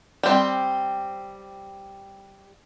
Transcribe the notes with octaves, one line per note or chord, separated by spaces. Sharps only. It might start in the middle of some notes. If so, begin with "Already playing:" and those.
G3 C4